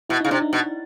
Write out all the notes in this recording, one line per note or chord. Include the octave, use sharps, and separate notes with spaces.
B2 E4
C#3 D#4
C3 D4
D#4
B2